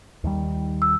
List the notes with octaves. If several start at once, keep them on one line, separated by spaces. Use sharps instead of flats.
D#2 D#3 G3
E6